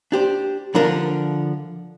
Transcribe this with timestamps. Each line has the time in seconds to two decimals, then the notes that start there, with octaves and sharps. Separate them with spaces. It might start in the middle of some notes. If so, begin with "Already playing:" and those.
0.12 D4 G4 C5
0.75 D3 F3 D4 A#4